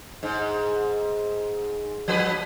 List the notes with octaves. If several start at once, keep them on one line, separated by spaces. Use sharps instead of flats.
G#2
F3 B4